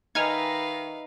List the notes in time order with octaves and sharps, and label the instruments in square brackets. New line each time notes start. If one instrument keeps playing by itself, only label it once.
[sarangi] D#3 [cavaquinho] D#4 E5 [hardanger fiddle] B4 F5 [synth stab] G#5 F6 G#6